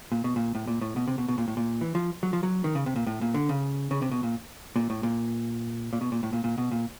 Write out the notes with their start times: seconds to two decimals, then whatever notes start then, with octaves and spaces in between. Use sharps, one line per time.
0.12 A#2
0.24 B2
0.36 A#2
0.55 A2
0.67 A#2
0.81 A2
0.96 B2
1.08 C3
1.18 B2
1.28 B2
1.38 A#2
1.48 A2
1.57 A#2
1.81 E3
1.95 F3
2.23 F#3
2.33 F3
2.43 F#3
2.64 D#3
2.75 C#3
2.86 C3
2.96 A#2
3.07 A2
3.21 A#2
3.34 D3
3.49 C#3
3.91 C#3
4.02 C3
4.11 B2
4.23 A#2
4.76 A#2
4.90 A2
5.03 A#2
5.93 A#2
6.01 B2
6.12 A#2
6.23 A2
6.33 A#2
6.44 A#2
6.58 B2
6.72 A#2